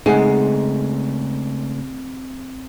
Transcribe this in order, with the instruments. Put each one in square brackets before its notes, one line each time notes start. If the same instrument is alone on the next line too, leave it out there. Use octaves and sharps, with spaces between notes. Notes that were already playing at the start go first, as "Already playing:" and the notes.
[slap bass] C#3 A3 [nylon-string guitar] G#3 [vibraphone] C4 [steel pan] D#4 G#4 F#5